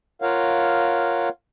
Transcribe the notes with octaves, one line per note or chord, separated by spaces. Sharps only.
F4 A#4 C#5 F5 F#5